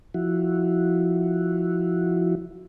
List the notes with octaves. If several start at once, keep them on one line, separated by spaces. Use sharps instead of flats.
F3 E4 F#4